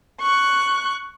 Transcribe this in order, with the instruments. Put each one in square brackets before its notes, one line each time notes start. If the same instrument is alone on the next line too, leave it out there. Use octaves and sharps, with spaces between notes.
[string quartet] C#6 F#6